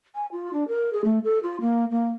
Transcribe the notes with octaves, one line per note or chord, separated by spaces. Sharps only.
G#5
F4
D4
A#4
G#4
A3
A4
F4
A#3
A#3